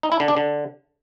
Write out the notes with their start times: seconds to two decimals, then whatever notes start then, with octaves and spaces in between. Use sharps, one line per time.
0.03 D#4
0.12 E4
0.20 D3
0.28 D4
0.37 D3